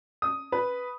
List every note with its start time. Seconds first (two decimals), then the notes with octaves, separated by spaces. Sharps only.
0.22 D#6
0.52 B4